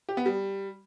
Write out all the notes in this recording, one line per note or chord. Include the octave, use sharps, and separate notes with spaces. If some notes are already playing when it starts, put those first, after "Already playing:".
G4
B3
G3